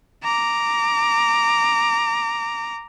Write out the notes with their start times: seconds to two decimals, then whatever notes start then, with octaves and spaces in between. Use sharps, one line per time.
0.23 A#5 D6